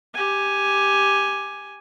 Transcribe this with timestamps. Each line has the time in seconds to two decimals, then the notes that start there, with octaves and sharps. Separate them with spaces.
0.14 G4 G#5